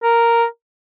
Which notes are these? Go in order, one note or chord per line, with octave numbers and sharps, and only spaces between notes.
A#4